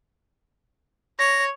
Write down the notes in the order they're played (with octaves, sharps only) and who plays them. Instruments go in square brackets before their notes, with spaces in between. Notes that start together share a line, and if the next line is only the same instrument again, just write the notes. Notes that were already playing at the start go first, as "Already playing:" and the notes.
[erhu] C#5 [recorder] A#6